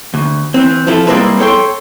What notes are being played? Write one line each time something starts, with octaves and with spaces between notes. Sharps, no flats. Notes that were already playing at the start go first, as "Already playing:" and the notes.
D2
E3 C4
F3 C4 E4 A4
G3 G#3 A#3 C4 E4 B4
A4 C#5 G5 C6